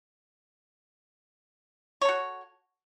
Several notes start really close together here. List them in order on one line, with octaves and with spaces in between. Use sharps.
C#5 A4 F#4